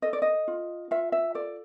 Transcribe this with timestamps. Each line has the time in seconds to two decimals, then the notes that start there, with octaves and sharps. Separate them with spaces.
0.02 A4 D#5
0.13 D5
0.22 D#5
0.48 F4
0.91 F4 E5
1.12 E5
1.35 A4 D5